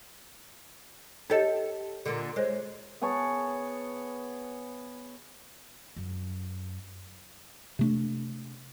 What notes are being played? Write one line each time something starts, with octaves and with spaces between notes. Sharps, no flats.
D#4 G4 A4 C#5 D#5
A#2 D3
G#3 A4 C5 C#5
B3 G#4 C#5 A5
F#2
C3 A3 D4